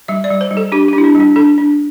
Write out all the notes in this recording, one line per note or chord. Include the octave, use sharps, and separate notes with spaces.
G3 E5
D5
G3
C5
G3
A4
D4 G4
G4
D4
E4
D4
G3
D4
D4 A4
D4